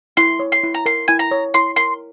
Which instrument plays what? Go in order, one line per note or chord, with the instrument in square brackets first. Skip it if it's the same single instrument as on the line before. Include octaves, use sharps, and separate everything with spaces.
[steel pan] E4 [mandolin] C6
[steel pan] C#5
[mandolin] C6
[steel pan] E4
[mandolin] A#5
[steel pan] A#4 [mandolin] C6
[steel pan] E4 [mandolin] G#5
[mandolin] A#5
[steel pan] C#5
[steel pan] E4 [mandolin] C6
[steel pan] A#4 [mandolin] C6